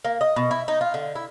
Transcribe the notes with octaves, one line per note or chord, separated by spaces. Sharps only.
A#3
D#5
B2
E4
D#4
F4
D3
E4